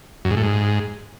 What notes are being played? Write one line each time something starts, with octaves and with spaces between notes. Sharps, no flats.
F#2
G#2
A2
G#2